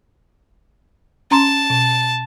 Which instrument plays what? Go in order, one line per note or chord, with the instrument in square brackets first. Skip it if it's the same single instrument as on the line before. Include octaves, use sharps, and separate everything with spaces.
[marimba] C#4 A#5 C6 [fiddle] A5
[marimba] B2